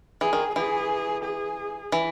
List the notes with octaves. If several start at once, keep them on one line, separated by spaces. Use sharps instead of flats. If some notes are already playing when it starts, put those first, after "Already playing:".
E3 G#4
D#3
E3 G#4
G#4
E3